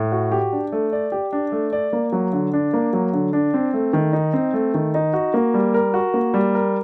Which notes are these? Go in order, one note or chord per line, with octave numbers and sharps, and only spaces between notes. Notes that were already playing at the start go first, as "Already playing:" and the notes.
Already playing: A2
F#4
G4
D4
A3
D5
G4
D4
A3
D5
A#3
F#3
D3
D4
A#3
F#3
D3
D4
C4
A3
D#3
D#4
C4
A3
D#3
D#4
F#4
A#3
G3
A#4
F#4
A#3
G3
A#4